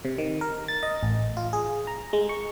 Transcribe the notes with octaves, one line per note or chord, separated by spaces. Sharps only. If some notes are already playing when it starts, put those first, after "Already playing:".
C3
D#3
A#4
A6
D#5
A1
F4
G#4
A#5
G#3
C#6